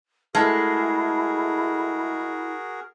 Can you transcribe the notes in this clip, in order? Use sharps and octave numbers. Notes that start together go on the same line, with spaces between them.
G#3 A3 E4 F#4 G#4 A#4 A5 F6